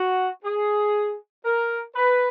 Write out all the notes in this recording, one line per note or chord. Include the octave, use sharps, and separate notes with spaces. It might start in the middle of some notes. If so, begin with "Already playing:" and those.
Already playing: F#4
G#4
A#4
B4